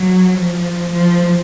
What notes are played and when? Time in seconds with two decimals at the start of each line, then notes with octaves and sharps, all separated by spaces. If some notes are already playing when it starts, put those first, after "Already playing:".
Already playing: F#3
0.34 F3
0.92 F3